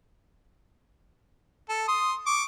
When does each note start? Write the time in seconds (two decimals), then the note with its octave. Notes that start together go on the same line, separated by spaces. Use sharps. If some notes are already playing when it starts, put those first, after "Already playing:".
1.69 A4
1.88 C6 D#6
2.26 C#6 D6